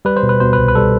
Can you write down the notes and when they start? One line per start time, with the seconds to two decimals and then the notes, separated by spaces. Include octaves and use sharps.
0.05 G3 B4
0.17 C5
0.23 B2
0.29 B4
0.40 B2 C5
0.53 B4
0.58 C2
0.68 B4
0.75 G3 A4